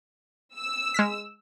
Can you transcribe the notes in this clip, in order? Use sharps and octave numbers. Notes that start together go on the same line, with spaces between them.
E6
G#3 F6 B6